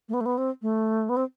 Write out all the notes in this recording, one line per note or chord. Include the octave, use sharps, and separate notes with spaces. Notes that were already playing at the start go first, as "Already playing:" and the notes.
A3
B3
A3
B3
C4
A3
B3
C4